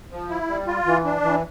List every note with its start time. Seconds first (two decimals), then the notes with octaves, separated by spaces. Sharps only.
0.11 F3
0.29 E4
0.48 G3
0.67 F4
0.86 E3
1.04 D4
1.24 E3